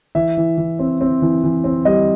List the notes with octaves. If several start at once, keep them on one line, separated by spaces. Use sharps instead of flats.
E3 E5
E3
E3
C4
C4
E3
E3
C4
G3 D#5